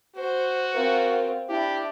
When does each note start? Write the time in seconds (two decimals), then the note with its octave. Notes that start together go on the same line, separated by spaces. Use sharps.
0.16 F#4 C5
0.74 C4 F4 A#4
1.49 D4 E4 G4